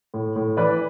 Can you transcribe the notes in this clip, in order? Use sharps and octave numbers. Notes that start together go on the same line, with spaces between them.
A2
A2
E3 B4 D5